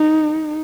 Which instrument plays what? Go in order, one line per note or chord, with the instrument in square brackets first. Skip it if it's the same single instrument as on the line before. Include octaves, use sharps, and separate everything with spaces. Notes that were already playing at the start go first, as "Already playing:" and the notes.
Already playing: [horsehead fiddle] D#4